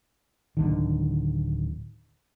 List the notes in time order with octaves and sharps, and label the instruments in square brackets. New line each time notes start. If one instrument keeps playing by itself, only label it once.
[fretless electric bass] D1 D3 D#3